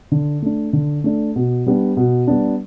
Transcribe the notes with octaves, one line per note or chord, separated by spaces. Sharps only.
D3
A3 D4
D3
A3 D4
B2
G3 B3 D4
B2
G3 B3 D4